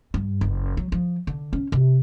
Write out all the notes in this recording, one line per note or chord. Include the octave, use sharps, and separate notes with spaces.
G2
F#1
F#3
F3
D3
C#4
C3